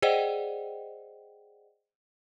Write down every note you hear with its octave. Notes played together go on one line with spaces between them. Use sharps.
G#4 C5 D5 D#5 F#5 G5